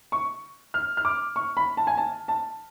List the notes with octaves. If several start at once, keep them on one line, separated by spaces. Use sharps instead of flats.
C#6
F6
F6
D6
C#6
B5
A5
G#5
A5
A5